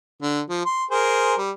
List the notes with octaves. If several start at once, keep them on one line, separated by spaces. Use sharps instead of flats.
D3
F3
C6
G#4 A#4 C5
G3